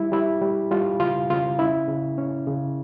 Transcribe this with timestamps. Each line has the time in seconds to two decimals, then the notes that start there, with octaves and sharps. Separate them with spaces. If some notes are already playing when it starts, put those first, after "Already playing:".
Already playing: G3 E4
0.12 G3 E4
0.41 G3
0.71 G3 F4
1.00 C#3 F4
1.30 C#3 F4
1.59 C#4 E4
1.88 C#3
2.18 C#4
2.47 C#3